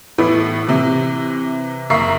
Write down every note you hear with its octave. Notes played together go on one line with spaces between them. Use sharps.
A2 E3 B3 E4
C3 E3
F#1 A#3 E5 A#5 C#6 C7